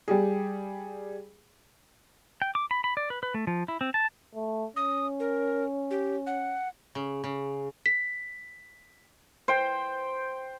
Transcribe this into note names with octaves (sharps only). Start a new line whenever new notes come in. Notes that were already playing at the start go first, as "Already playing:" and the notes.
G3 G4 G#4
G5
D6
B5
B5
D5
B4
B4
A3
F3
E4
C4
A5
A3
C#4 D#6
A#4
G4
F#5
C#3
C#3
B6
C5 G5